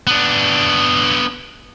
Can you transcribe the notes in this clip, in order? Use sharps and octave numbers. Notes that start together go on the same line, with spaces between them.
B3 D4